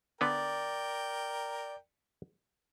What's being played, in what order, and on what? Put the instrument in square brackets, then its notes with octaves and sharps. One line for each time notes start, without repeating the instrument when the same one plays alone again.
[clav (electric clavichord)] D3 B3 B4 [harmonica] A#4 G5 [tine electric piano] D5